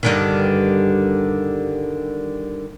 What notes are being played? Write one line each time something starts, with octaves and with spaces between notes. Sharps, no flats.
G2 D3 D#3